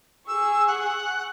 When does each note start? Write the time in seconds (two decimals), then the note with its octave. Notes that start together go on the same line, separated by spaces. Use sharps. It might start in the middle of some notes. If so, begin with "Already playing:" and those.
0.28 G#4 C#6 E6
0.68 F#5